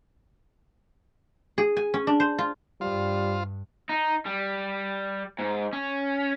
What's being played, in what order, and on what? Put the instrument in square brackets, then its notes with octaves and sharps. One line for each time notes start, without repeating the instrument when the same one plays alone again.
[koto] G#4
G#5
C#4
D4
C5
F4
[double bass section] G2 [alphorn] G3 [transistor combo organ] F4 C5
[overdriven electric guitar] D#4
G3
G#2
C#4